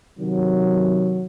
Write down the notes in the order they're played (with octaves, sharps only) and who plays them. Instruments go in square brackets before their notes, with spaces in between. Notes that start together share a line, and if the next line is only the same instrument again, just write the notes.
[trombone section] C3 D#3 F#3